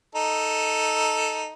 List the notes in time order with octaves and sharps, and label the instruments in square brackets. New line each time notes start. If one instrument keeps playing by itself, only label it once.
[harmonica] D#4 A4